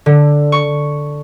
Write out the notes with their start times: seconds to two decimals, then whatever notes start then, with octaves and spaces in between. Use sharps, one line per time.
0.06 D3
0.52 C#6